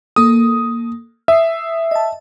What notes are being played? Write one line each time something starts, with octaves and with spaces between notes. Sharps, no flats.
A#3 A4 D#6
E5 D#6 C7
D#5 A5